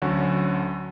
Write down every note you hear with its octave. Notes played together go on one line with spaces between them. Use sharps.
D2 D3 F#3 C#4 F#4